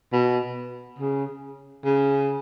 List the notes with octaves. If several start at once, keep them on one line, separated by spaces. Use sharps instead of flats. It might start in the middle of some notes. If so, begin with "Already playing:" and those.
B2
C#3
C#3